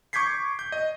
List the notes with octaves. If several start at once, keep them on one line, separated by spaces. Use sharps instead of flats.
C#6 D6 G6 G#6 B6 C7
G6
D#5